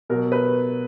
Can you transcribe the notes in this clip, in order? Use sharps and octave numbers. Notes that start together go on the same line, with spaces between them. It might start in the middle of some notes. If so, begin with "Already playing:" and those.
B2 F#3 A#4
B4